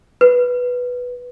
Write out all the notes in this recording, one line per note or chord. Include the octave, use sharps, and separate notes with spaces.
B4